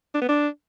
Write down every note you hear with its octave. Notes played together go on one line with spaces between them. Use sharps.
D4
B3
D4